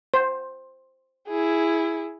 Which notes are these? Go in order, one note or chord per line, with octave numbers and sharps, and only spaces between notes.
C5
E4 G#4